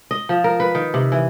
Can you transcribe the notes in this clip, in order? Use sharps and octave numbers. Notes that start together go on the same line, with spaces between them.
D#5
F3
A#4
B4
D#3
C3
E3